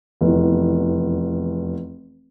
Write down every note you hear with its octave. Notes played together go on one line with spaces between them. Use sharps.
F1 E2